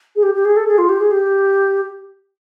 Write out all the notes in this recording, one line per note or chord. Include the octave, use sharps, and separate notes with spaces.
G#4
G4
G4
G#4
A4
G#4
F4
G4
G#4
G4